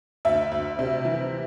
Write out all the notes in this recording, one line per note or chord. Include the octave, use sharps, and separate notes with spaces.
D2 E5
D2
C3
E3